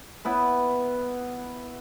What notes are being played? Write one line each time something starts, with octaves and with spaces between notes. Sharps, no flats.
B3 E4 B4